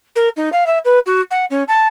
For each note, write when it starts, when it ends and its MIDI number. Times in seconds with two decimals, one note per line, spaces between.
0.16 0.29 70
0.37 0.49 63
0.52 0.66 77
0.66 0.78 76
0.85 0.99 71
1.06 1.21 66
1.31 1.45 78
1.50 1.63 61
1.68 1.87 81